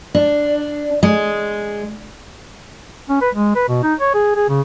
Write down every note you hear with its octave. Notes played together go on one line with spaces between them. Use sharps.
D4
G#3
C#4
B4
G#3
B4
B2
D#4
C#5
G#4
G#4
C#3